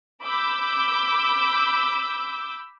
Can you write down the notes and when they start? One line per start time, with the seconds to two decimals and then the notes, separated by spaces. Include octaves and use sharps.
0.22 B5 D6 E6 G6